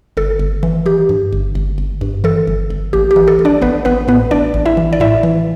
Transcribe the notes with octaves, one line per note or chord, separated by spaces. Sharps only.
G1 A4
G1
E3
E3 G4
G2
G1
G1
G1
G2
E3 A4
G1
G1
A1 G4
G4
E3
A4
A1
D4 D5
A1 B3 B4
A1 B3 B4
A2 B3 B4
A1 D4 D5
A1
E4 E5
E3
D5
A2 E4 E5
E3